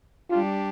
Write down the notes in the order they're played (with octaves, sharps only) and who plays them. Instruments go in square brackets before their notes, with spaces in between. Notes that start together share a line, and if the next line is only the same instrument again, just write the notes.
[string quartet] G3 D4 G4 [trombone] F4